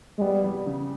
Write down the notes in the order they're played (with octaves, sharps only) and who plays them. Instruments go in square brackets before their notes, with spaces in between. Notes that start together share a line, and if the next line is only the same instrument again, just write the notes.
[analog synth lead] G#3
[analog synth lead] G3 [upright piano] B3
[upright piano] G3
C#3